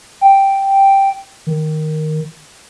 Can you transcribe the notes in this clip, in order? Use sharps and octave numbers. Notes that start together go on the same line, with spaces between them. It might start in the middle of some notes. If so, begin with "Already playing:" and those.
G5
D#3